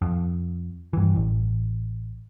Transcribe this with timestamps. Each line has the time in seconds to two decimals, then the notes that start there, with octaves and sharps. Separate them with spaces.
0.02 F2
0.93 G2 E3
1.16 A1